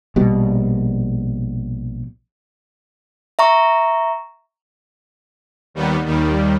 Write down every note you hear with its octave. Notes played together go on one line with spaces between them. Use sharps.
A#1 B2 G3
E5 A#5 C#6
D#2 D#3 G3 B3
D#2 D#3 G3